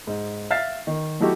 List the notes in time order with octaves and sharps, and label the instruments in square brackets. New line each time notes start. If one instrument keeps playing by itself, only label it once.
[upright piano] G#2
E5 F5 F6 A6 C7
D#3
F#3 A3 D#4 E4 F#4 G4